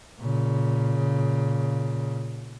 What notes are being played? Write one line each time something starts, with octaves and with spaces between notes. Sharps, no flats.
A#2 C#3